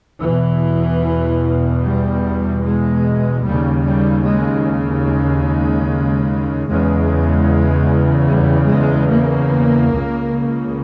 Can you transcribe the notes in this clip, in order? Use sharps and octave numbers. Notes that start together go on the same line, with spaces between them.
E2 B2 E3
G3
G#3
D#2 C#3 G3
G3
G#3
G#3
E2 C#3 G#3
G3
G#3
A#3
C#2 C#3